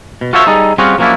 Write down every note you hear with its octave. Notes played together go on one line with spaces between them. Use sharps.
B2
F4 F#4 A4 C5 C#5 E5
G3 D#4 G#4 A4
G3 C4 C#4 F4 F#4 G#4
F3 F#3 A#3 C#4 D4 E4